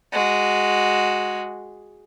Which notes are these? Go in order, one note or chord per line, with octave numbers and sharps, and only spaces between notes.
G#3 F#4